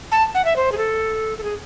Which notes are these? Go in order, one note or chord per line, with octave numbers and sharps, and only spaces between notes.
A5
F#5
E5
C5
G#4
A4
A4
G#4